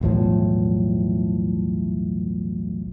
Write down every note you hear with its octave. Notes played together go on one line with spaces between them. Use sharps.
B1 E2 A2 F3